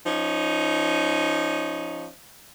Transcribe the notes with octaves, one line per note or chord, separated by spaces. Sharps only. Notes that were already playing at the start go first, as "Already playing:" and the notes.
F3 C#4 D#4